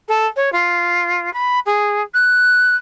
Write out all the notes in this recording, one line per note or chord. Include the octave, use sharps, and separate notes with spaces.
A4
C#5
F4
B5
G#4
F#6